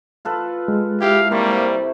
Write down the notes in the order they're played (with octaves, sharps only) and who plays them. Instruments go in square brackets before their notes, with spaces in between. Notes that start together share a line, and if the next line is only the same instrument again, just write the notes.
[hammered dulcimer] F4 A4 B4
[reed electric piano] G#3
[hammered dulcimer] E4 [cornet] G4 [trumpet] F5
[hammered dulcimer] C3 C5 C#6 [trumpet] G3 [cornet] A#3